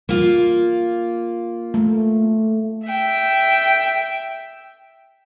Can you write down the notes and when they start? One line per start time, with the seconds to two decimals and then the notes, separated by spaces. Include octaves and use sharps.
0.09 A#3 F4
1.74 A3
2.85 E5 G5